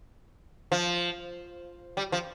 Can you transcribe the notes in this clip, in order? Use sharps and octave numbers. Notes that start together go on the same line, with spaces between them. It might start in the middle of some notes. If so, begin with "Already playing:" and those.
F3
G3
F3